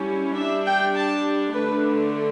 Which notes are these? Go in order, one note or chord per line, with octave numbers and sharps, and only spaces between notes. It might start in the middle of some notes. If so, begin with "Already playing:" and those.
Already playing: G3 C#4 E4
G3 D4 E5
G5
A5
D3 A3 D4 B4